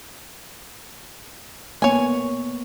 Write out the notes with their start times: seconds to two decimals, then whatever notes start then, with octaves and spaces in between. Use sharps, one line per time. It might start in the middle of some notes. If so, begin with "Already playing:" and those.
1.82 A#3 B3 C#5 G#5